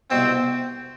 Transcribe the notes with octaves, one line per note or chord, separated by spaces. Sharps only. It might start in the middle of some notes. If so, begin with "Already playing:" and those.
C2 B2 B3 C4